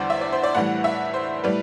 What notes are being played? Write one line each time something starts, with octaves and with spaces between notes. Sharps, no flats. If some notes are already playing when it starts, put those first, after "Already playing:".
Already playing: E2 D3 G3 C5 D5
E5
D5
C5
D5
A2 E3 G3 F#5
E5
C5
A2 G3 B4